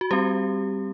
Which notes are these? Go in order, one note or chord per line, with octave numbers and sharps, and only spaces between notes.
F#4
G3 C4 G4